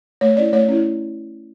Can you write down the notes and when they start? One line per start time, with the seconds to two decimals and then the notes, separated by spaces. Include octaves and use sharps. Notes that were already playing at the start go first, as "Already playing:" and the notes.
0.21 A3 C#5
0.37 C#4 E4 D5
0.53 A3 C#5
0.68 C#4 E4